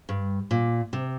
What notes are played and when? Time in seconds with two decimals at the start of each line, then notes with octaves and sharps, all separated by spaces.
0.09 G2
0.51 A#2
0.93 C3